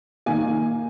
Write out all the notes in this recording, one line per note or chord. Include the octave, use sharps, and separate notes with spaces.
D#3 A#3 G#5